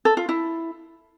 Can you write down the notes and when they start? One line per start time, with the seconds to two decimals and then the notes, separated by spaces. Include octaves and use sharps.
0.05 A4
0.17 F4
0.29 E4